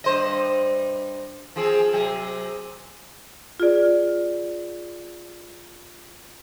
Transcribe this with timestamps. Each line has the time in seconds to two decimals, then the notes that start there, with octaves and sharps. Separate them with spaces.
0.04 G2 C5 D#5
1.56 F3 C4 G#4
1.93 C3 F#3 G#4
3.60 F4 G#4 D5